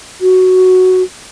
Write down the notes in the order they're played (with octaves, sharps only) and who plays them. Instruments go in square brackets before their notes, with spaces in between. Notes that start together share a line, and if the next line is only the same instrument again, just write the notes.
[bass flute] F#4